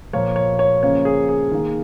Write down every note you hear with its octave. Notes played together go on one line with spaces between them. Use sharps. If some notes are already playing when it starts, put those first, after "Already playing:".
A#2 F3 A#3 C#5
C#5
C#5
C#3 F3 A#3 C#5
G#4
G#4
D#3 A#3